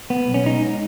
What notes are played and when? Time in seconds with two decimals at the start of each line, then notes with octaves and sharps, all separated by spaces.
0.10 B3
0.28 B1
0.34 C#4
0.45 G#3 D#4